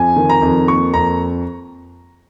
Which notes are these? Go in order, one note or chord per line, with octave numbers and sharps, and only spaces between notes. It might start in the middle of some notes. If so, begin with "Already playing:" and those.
Already playing: F2 G#5
D#3
A#5
F2
A#3 C#6
F2 A#5